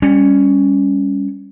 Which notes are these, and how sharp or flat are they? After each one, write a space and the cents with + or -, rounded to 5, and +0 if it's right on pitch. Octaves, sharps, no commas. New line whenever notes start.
G3 +30 C#4 +5